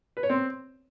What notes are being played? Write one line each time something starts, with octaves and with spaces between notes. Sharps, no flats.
B4
C#5
C4